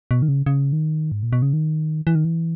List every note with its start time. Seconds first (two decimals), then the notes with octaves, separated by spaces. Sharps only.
0.11 B2
0.22 D#3
0.28 C#3
0.46 C#3
0.73 D#3
1.12 G#2
1.23 A#2
1.33 B2
1.42 C#3
1.53 D#3
2.07 E3
2.15 D#3
2.25 E3